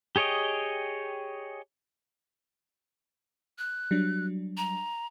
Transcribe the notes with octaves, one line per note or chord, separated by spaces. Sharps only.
G4 G#4 C#5 D#5 G5
F#6
F#3 G3 D4
A#5